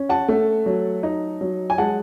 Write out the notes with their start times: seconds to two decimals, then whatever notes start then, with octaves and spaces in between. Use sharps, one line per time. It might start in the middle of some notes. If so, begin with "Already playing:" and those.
Already playing: C#4
0.09 F#5 A5
0.28 A3
0.66 F#3
1.03 D#4
1.41 F#3
1.70 G#5
1.78 G#3 F#5 A5